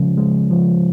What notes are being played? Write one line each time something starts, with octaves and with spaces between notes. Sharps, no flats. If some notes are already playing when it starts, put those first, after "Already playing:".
Already playing: C#3 F3 G#3 C#4
G#3
F3